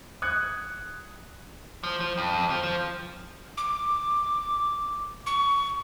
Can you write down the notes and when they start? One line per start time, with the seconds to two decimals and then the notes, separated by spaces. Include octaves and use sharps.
0.22 D#6 F#6 G#6 C#7
1.84 F3
2.00 F3
2.18 F2
2.50 F3
2.63 F3
3.57 D6
5.26 C#6